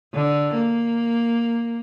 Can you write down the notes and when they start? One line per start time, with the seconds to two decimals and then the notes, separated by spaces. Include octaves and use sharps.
0.14 D3
0.55 A#3